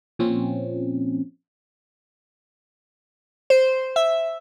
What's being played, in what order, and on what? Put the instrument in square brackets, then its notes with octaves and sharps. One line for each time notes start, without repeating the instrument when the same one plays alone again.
[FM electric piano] A#2 F3 C4 C#4
[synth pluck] C5
E5